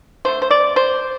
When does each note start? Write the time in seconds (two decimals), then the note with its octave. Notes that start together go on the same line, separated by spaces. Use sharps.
0.25 D3 A3 C5
0.42 C5
0.51 D5
0.76 C5